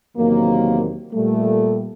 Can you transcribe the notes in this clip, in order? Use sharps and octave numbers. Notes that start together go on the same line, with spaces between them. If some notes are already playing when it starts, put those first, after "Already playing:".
E2 C3 D#3 F#3 A#3
A#2 G3 A3